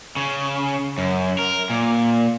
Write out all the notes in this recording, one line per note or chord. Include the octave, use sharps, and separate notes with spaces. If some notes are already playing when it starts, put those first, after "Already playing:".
C#3
F#2
A#4
A#2